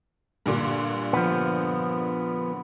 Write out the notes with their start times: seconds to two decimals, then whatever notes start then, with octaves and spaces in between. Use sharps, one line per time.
0.46 G2 A#2 D3
1.13 F3 B3